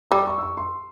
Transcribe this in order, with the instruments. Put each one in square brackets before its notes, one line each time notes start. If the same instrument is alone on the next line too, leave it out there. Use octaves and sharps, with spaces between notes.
[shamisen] G3 [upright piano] E6
[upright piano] C#6
E6
C#6
C6